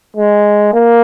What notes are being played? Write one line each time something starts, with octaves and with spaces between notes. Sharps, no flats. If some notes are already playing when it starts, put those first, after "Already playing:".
G#3
A#3